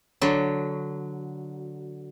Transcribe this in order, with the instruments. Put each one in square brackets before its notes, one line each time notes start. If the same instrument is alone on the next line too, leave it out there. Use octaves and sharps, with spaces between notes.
[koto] D3 F#3